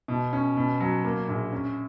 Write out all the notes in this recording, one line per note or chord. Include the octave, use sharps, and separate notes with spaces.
B2
C#4
B2
F#3
A#3
A#1
C#4